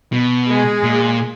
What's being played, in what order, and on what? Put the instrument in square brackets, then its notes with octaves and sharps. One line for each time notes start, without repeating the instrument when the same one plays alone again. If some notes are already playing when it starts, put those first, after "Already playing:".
[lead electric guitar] B2
[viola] G#3 G#4
[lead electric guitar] A#2